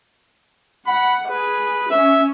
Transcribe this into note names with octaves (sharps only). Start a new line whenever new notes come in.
F#5 B5
G#4 B4
C#4 E5